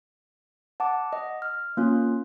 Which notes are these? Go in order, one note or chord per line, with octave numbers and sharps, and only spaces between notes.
F#5 A5 D6
D#5
F6
A#3 C#4 F4